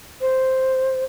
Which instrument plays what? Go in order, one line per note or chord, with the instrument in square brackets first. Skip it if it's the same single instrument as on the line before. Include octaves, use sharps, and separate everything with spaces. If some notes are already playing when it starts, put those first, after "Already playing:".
[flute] C5